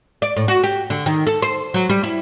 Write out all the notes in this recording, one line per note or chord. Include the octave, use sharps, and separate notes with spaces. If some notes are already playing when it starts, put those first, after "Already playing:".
D5
A2
F#4
G4
D3
D#3
A4
C5
F#3
G3
E4